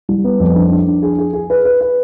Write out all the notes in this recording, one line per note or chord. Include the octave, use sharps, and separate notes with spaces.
G3
B3
F2
D4
D4
D4
G#4
G#4
G#4
B4
B4
B4